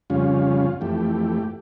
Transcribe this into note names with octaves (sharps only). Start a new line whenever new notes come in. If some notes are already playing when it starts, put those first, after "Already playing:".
F2 C#3 G3 C#4 F4
F2 E3 A3 G4